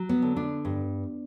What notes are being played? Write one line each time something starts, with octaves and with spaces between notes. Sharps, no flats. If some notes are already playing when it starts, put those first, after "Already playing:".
Already playing: F#3
B3
D3
B3 D4
G2